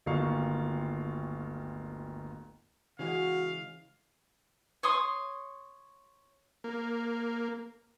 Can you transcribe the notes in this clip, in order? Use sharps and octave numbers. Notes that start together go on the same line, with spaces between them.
D1 G1 D#3 A#3 F5 C#6
C#3 E3 G#3 F#4 F5
C#5 C6 D#6
A#3